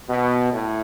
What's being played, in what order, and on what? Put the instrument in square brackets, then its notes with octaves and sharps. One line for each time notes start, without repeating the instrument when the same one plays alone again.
[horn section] B2
A2